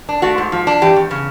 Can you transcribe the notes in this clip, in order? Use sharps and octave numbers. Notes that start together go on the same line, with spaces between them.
D4
A3 F#4
G#2
F3
D4
E3 G4
E2
C#3